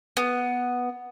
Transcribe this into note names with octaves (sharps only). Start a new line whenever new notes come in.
B3